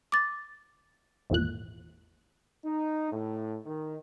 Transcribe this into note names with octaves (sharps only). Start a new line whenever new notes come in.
D6 A6
G#1 E2 A#2 F#6
D#4
A2
D#3